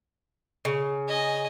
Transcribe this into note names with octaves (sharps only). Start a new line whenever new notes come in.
C#3
D#5 G#5